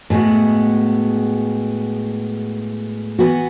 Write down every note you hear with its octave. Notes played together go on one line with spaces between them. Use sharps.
A2 G#3 B3 F#4
E3 B3 F#4